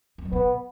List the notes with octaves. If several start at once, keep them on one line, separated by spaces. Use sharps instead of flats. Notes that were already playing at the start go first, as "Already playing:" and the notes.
F#2
G#2
B2 B3